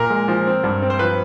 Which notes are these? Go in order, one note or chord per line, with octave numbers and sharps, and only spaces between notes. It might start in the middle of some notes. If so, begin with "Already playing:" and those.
Already playing: A#2 A#4
G#3
F3
C4
G2
C4
C5
F3 B4